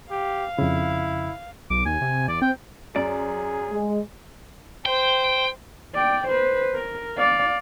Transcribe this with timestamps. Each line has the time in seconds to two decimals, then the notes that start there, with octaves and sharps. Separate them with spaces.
0.11 G4 F5
0.59 F2 C#3 E4
1.70 B1 D6
1.86 D#2 G#5
2.01 C3
2.28 E2 D5
2.42 C4 G5
2.96 F#2 G#4 D5
3.70 G#3
4.86 C5 G5
5.95 D5 G5
6.28 B4 C5
6.74 A#4
7.18 D5 F5